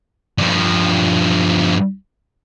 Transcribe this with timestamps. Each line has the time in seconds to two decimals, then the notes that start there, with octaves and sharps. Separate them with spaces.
0.38 G2 F3